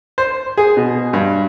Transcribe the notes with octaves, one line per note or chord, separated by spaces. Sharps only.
C5
G#4
B2
G2